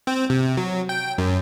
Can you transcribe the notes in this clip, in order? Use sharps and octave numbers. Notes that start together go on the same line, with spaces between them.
C4
C3
F#3
G5
F#2